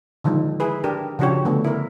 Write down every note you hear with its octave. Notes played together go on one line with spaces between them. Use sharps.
D3 D#3 F3 G#3
E4 G#4 B4
D4 G4 A#4
C#3 F3 D4 F#4 G4 C#5
D3 A3 B3
E4 A#4